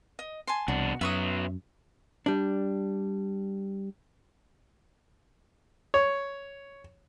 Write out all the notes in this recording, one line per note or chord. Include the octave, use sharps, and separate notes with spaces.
D#5
G#5 A5 C6
C2 B2 D4 F#4
F#2 F#3 B3 E5 C#6 D#6
G3 D4
C#5